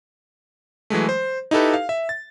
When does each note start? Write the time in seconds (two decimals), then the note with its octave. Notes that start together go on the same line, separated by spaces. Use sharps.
0.90 E3 F#3 G#3 A3
1.09 C5
1.51 D#4 E4 G4 A4 B4
1.74 F5
1.89 E5
2.09 A6